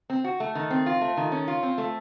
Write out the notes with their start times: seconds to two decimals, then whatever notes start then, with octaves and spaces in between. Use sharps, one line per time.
0.10 C4
0.24 F#4
0.40 A3
0.55 D#3
0.70 C4
0.86 F4
1.01 A3
1.17 D#3
1.32 C#4
1.48 F4
1.63 C4
1.78 A3